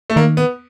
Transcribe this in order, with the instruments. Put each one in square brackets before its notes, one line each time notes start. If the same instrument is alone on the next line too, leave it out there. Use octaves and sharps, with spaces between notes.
[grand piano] A3
[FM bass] D#3 [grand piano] A#3
[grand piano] B3